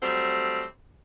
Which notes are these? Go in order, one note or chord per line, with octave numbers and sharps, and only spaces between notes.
F#3 G3 A3 C4